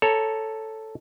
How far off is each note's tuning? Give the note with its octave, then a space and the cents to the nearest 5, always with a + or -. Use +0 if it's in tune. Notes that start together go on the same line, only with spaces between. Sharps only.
A4 +0 C#5 +0 A#5 +10